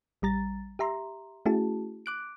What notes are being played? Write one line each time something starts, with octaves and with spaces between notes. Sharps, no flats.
A1 G3 A#5 A6
G4 E5 A#5 C6
A3 C#4 E4 F#4 G#4 A5
D6 F#6 D7